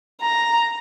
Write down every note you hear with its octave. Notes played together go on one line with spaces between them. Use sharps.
A#5